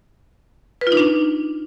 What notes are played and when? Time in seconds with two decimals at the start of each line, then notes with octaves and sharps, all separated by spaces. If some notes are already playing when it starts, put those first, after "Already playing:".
0.81 B4
0.87 F4
0.92 D#4
0.97 D4